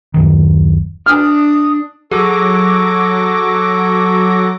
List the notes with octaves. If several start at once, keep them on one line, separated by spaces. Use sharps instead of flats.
D1 F#2 D#3
D4 D#6 F6
F#3 G#4 A4 C#6 D6 A#6